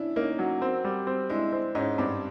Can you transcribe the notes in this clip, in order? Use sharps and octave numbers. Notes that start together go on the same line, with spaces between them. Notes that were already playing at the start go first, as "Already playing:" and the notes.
Already playing: C#4 D4 E4
A#3 C#4 D#4
F#3
C4
G3
C4
G#3 D4 E4
C4
G#2 C#4 D#4
G2 C4 D4